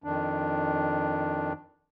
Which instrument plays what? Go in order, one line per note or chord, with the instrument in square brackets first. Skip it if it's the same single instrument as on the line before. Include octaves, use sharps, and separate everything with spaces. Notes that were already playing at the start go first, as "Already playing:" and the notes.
[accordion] F2 D#3 D4